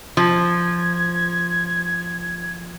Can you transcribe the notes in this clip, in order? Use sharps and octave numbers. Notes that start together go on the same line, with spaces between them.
F3 G#6